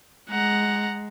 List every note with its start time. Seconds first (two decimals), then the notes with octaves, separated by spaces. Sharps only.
0.30 G#3 F#5 A#5